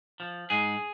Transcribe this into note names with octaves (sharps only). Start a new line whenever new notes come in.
F3
G#2 G#4